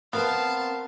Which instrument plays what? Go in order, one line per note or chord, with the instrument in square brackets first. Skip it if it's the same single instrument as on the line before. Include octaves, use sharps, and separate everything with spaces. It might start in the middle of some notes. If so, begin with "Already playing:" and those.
[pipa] B3 [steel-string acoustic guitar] C4 A#4 C5 [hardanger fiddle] F5 A5